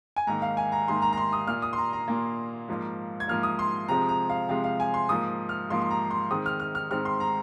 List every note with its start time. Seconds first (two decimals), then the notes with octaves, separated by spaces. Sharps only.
0.16 G#5
0.27 G#2 D#3 A#3 A#5
0.42 F5
0.57 G#5
0.72 A#5
0.88 G#2 D#3 A#3 C6
1.02 A#5
1.13 A#5
1.17 C6
1.33 D#6
1.47 A#2 A#3 F6
1.62 D#6
1.73 C6
1.78 A#5
1.93 A#5
2.08 A#2 A#3
2.69 G#2 F3 A#3
3.20 G#6
3.28 G#2 F3 A#3 F6
3.43 D#6
3.59 C6
3.88 C3 F3 G#3 C4 A#5
4.09 A#5
4.29 F5
4.49 C3 F3 G#3 C4 F5
4.64 F5
4.80 G#5
4.94 C6
5.09 G#2 F3 A#3 D#6
5.49 F6
5.69 G#2 F3 A#3 C6
5.81 C6
5.90 A#5
6.11 C6
6.30 G#2 D#3 G#3 C4 D#6
6.46 F6
6.60 F6
6.75 F6
6.91 G#2 D#3 G#3 C4 F6
7.05 C6
7.20 A#5